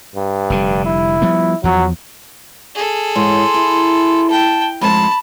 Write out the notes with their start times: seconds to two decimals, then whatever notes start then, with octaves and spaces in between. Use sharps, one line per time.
0.16 G2
0.50 F1 D3 G3
0.85 E4
1.22 F3 G3 B3
1.64 E2 F3 F#3
2.75 G#4 A4
3.15 G#2 E3 C#5 C6
3.54 E4
4.30 G5 A5
4.81 F2 G#3 C5 A5 B5